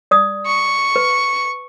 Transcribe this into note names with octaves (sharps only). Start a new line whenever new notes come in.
D5 D#6
C#6
B4